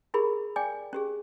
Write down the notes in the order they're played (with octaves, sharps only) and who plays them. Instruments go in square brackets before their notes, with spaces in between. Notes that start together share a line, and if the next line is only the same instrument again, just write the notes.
[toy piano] E4 G4 G#4 A#4 B5
D5 G5 G#5 D6
C#4 G4 G#4